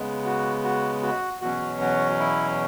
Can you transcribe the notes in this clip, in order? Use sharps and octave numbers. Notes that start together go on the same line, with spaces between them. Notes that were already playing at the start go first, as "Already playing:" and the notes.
Already playing: C#3 G#3 B3
F#4
F#4
F#4
E2 B2 F#3 C#4 F#4
F#4
E4